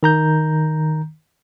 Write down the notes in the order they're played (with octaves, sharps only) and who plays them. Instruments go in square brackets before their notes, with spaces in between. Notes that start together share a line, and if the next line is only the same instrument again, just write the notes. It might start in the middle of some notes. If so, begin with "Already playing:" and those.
[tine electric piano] D#3 A#5 G6